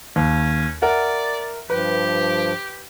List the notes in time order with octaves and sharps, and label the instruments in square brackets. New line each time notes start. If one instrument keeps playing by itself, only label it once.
[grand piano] D#2 [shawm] C#4
[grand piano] A#4 E5 F#5 [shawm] D5
[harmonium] G2 F3 [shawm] G4 [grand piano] B4